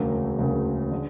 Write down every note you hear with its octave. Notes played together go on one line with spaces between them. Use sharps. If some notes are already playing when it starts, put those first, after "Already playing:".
Already playing: E1 D2 C#3 F#3 A#3
E1 D2 C#3 F#3 A#3
D3